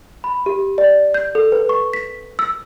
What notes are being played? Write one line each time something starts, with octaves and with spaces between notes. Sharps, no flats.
B5
G4
D5
G6
A4
B4
C#6
B6
E6